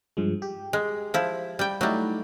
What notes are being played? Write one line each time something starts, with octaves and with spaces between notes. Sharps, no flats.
G2 F3 G#3
G4
G#3
F3 E4
G3 G5
F#3 G3 A3 D#4 E4